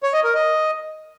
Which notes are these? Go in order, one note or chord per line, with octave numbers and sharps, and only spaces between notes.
C#5
D#5
A#4
D#5